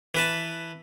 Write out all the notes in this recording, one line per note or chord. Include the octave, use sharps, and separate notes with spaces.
E3 B4 A5